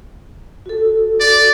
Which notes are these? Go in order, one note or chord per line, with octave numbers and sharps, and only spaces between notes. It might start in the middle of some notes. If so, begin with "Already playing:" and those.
F#4 A4
D5